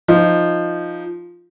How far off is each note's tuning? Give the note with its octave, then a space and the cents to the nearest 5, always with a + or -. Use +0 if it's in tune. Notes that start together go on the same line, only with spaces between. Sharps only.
F3 +0 D#4 +0